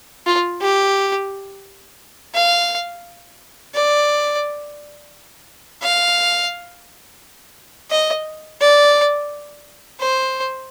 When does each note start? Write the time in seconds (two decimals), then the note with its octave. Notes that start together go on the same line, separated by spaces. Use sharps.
0.26 F4
0.61 G4
2.34 F5
3.74 D5
5.82 F5
7.91 D#5
8.61 D5
10.00 C5